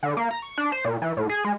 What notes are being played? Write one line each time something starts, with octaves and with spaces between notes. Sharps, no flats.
D3
A#3
A#5
C#6
D4
C5
A#2
E3
A2
G#4
G#3